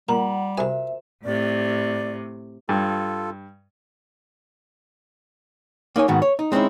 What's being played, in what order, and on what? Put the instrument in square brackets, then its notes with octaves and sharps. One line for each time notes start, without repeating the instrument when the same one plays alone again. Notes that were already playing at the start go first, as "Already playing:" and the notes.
[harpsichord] A#2 [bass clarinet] G3 [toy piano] F4 A#5 [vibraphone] F#5
[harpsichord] C2 G#5 [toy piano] F#4 A#4 C5 [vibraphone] E5
[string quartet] A2 C3 [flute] D5
[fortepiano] G2 [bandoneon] F4 A4
[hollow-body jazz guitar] A#3 D#4 C#5 G#5
G#2 D#3 B3 F#4
C#5
D#4
G#3 C4 C#4 D#4 E4